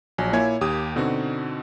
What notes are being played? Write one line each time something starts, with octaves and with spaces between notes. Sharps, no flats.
A#1 F#3 G#5
A#2 A#3 E4 C#5 G#5 G#6
D#2 G4 D#6
B2 D3 C4 D#4 F#4